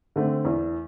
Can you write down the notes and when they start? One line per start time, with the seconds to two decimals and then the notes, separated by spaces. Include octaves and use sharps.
0.16 D3 A3 C4
0.45 E2